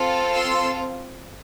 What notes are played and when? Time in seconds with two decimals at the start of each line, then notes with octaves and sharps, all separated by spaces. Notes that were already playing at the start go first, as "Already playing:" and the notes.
Already playing: C4 F4 A4
0.32 C6 E6